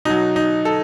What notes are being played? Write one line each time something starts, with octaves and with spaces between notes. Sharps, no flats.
B2 F#3 D#4
D#4
A4